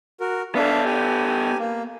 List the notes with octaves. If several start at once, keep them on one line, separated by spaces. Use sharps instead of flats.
F#4 A#4
B3 D4 A4 E5 F5
G4 G#5
A#3